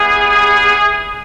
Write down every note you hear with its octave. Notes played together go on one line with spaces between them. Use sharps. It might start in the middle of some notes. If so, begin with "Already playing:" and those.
Already playing: G3 B3 E4 G4 G#4